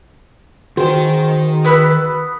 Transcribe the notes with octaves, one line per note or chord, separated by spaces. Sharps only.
D#3 F#4 G#4 C5 G5
B3 B4 E6